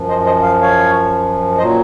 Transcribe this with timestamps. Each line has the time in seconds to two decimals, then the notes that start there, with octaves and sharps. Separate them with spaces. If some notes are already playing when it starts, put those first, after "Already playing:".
Already playing: F#2 F3
0.09 C5 D#5
0.25 C5 D#5
0.42 F5
0.61 C#5 F5
1.58 A#2 F#3 C5 D#5